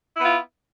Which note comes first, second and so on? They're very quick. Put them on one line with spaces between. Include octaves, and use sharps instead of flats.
E4 B3 F4